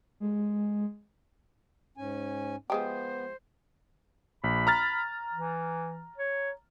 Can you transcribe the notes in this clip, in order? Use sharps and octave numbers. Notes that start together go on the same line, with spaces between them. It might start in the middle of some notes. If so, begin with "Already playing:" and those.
G#3
G#2 C#4 G#5
F3 G#3 B3 G4 C5
A#1 B5
A#5 F6 A6
E3
C#5